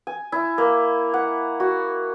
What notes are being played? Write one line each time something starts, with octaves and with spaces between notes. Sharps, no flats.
G#5
E4
A#3
F#5
F#4